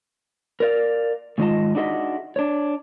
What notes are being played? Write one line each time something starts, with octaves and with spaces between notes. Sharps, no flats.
A#4 D5 F5
G#2 D#3 G#3 F4 D#5 A5
D4 D#4 F#4 G#4 D#5 E5
D4 C#5